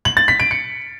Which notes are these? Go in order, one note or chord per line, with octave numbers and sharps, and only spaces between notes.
F#7
A6
B6
D7
C#7